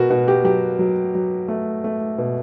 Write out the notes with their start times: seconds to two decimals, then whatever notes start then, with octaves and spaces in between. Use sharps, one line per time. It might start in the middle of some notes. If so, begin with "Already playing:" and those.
Already playing: B2 F#4 A#4
0.10 B2 F#4
0.28 G4
0.44 F#3 G4
0.79 F#3
1.15 F#3
1.48 A3
1.84 A3
2.18 B2